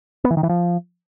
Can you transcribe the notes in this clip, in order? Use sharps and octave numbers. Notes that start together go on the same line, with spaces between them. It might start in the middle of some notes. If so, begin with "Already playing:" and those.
B3
E3
D#3
E3
F3